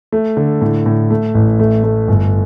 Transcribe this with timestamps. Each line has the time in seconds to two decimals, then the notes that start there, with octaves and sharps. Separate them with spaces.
0.12 A3
0.37 D3
0.61 A2
0.86 A2
1.10 A3
1.35 A1
1.60 A3
1.84 A3
2.08 G1